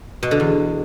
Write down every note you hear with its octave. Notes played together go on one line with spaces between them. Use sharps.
B2
D3
E2